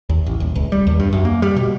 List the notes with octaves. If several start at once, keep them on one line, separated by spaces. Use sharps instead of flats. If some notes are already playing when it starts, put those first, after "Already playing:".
D#2
A1
D#1
C#2
G3
D#2
G2
F#2
A#3
G3
B2